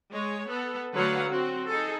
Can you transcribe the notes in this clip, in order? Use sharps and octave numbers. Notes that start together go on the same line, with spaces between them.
G#3 C#5
B3 A4
D3 F#3 A3 B4 F5 F#5
C4 F#4
D#4 G#4 A4